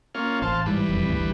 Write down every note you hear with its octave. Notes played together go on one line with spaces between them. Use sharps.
A#3 C#4 F4
A1 C5 F5 A5
G#2 E3 G3 B4
E1 F2
G1 D2 G2